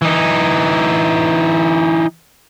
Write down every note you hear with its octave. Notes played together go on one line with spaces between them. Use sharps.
E3 D#4